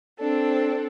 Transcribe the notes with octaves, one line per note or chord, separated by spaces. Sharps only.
C4 D4 A4